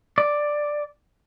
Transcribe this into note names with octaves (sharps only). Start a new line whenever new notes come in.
D5